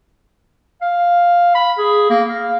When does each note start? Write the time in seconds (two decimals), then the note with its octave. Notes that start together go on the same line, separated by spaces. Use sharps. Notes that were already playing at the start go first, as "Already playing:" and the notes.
0.82 F5
1.55 B5
1.78 G#4
2.10 A#3
2.29 F5